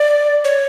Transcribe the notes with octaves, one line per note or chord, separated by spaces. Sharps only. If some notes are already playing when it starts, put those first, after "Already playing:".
Already playing: D5
C#5